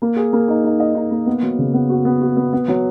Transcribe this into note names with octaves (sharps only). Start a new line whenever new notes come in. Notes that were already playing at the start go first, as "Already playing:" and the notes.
A#3
G#4
A#3
D#4
D#4
D#5
D#4
A#3
B3
F#3
C#3
B3
F#4
B3
F#4
B3
B3
F#3